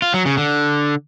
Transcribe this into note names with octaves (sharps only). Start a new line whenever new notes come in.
F4
F#3
C#3
D3